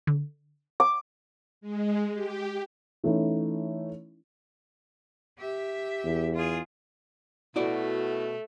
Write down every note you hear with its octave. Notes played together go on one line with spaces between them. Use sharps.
D3
D6
G#3
G4
E3 A3 C#4 D#4 E4
G4 E5
E2
F4 G#4
B2 A3 E4 F#4 D5